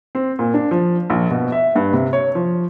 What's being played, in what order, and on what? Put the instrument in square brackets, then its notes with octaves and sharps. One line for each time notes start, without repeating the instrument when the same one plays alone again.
[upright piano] C4
A#2
D4
F3
A#1
B2
E5
G2
C3
C#5
F3